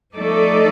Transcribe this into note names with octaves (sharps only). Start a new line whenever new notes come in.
F3 A3 D#4 A4 D5